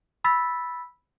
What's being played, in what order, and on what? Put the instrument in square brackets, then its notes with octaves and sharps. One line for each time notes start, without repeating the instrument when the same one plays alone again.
[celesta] B5 E6 A6 B6